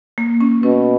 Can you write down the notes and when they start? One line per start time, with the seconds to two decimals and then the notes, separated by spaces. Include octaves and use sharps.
0.18 A#3
0.41 C#4
0.63 B2 C#4